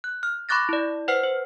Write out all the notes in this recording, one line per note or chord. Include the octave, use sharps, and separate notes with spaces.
F#6
F6
B5 C#6 D6 F#6 A6 A#6
E4 D5
B4 C5 F#5 F6 C7
C5